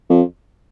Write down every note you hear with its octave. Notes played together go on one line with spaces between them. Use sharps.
F2